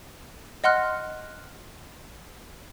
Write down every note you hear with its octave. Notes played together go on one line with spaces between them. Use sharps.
D#5 F#5 C6 F6 F#6